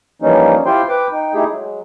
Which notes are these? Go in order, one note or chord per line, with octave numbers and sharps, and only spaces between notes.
E3 F3 G3 A#3 C#4 D#4
E4 F4 G4 C5 G5 C6
B4 G5 D6
D#4 G5
A3 D#4 E4 G4 G#4
F#3 G#3